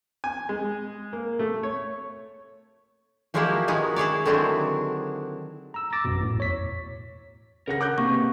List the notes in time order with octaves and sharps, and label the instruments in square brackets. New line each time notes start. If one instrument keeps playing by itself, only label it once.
[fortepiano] G#5
G#3
A#3
A3
C#5
[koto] F3 F#3 G#3 A#3 E4 G4
D#3 F#3 G#3 B3 G#4
E4 G#4 C#5 D5
D3 D#3 F#3 C4 D4 E4
[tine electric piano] A#5 E6
D6 E6 A6 A#6
A1 F#2 B2
A2
E2 C#5 B6
[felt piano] C#3 A#6 [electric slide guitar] A#4 F#5
[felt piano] D6 F#6 G6
[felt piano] C3 [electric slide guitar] A#3 B3 [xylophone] C#6